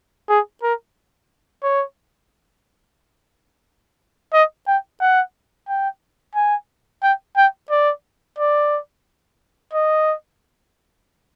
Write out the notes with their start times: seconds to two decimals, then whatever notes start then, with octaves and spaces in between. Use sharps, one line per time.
0.29 G#4
0.63 A#4
1.63 C#5
4.33 D#5
4.67 G5
5.01 F#5
5.68 G5
6.35 G#5
7.03 G5
7.37 G5
7.70 D5
8.38 D5
9.73 D#5